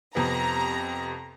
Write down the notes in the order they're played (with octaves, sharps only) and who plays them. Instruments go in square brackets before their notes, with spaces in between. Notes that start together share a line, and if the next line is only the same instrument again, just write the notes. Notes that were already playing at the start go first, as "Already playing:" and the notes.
[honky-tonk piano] F2 C3 B3 [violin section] A#5